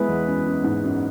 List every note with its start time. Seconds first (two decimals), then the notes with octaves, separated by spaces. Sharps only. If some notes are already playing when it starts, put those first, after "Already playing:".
Already playing: G#3 B3 E4 G#4 B4
0.08 E2
0.27 F#2
0.46 F#2
0.64 G#2
0.84 F#2